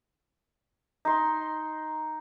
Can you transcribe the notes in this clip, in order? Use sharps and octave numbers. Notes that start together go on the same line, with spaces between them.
D#4 C6